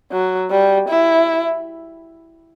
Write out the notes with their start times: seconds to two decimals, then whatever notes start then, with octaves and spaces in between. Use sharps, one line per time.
0.12 F#3
0.51 G3
0.89 E4